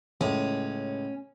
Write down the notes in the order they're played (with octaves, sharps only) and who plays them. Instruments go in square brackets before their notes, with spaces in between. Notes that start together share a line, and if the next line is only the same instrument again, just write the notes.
[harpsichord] C#2 A2 [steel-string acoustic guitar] C#4